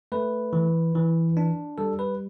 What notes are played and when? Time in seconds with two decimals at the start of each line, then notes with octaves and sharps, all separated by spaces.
0.12 A3 B4
0.53 E3
0.95 E3
1.37 D4
1.78 G3 A4
1.99 B4